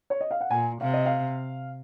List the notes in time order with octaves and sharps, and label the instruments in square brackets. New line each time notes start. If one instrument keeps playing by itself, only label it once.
[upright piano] C#5
D#5
F5
F#5
[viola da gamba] A#2 [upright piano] G#5
[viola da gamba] C3 [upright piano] F5
[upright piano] D#5
F5